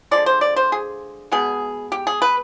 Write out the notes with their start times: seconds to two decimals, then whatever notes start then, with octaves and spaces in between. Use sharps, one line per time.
0.11 D3 F3 G#3 D5
0.26 C5
0.41 D5
0.56 C5
0.72 G#4
1.32 B2 G#3 B3 G#4
1.92 G4
2.07 G#4
2.22 B4